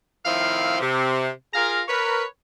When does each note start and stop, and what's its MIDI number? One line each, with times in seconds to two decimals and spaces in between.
0.25 0.78 45
0.25 0.78 51
0.25 0.78 53
0.25 0.78 60
0.25 0.78 64
0.25 0.78 77
0.81 1.28 48
1.54 1.82 65
1.54 1.82 68
1.54 1.82 70
1.54 1.82 77
1.54 1.82 82
1.88 2.24 70
1.88 2.24 71
1.88 2.24 73